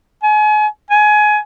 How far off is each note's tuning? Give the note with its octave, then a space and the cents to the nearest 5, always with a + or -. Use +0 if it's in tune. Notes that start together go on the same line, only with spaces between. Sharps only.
G#5 +35
G#5 +20